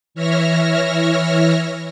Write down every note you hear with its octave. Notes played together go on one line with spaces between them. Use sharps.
E3 C#5 E5 F6 A#6